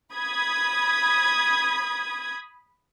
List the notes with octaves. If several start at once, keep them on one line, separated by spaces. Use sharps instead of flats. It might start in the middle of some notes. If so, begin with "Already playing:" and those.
B5 D#6 G#6